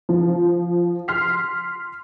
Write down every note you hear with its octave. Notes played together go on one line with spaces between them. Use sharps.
F3
C6 F6 B6 C7